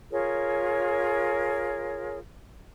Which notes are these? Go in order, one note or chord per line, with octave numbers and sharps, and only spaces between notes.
F4 G#4 A#4 C#5